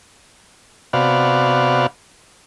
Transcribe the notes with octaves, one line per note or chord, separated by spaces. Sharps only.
C3 B3 F#4 D5 F5